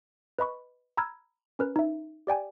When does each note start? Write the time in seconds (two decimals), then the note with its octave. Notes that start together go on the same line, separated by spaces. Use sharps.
0.39 B4 D#5 B5 C#6
0.97 A#5 B5 E6 F6 G#6
1.59 C#4 A#4 B4
1.76 D#4 E5
2.27 G4 D5 G5 G#5